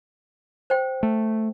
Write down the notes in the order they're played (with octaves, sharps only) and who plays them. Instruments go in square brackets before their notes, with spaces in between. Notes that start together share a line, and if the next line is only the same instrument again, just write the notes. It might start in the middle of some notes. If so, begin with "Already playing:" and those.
[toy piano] C5 G5
[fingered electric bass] A3